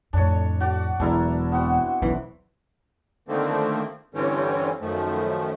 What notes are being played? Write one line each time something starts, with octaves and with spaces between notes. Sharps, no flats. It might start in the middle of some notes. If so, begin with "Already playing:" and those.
F2 A2 D4 C#5
F#4 D5
E1 E2 F#3 D4 E4 A#4
B3 C4 F#4
D#1 B1 E3 C#4
D3 D#3 F3 A3 A#3 C4
G2 D3 E3 G3 C4 C#4
F#2 D#3 F3 A3